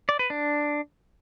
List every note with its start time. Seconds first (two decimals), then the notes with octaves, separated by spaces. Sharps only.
0.09 D5
0.19 B4
0.30 D4